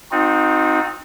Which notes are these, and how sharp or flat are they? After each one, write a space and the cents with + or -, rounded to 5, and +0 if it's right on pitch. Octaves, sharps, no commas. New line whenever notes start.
C4 +0 D#4 +0 F#4 -40